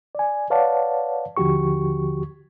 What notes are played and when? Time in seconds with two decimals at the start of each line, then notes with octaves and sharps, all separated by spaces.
0.15 D5 G#5
0.50 B4 C#5 D5 F5 F#5 A5
1.37 D#2 D3 F3 F#4 G4 C#6